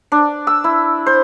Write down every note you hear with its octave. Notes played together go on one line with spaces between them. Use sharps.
D4
E6
E4
C5